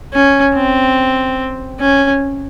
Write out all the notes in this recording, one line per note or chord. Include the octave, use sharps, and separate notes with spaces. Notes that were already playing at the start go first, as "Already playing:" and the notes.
C#4
C4
C#4